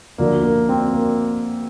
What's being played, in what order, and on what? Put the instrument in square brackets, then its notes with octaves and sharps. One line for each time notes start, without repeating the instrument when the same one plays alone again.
[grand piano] D2 D3 F3 A#3
A#3
C4
A#3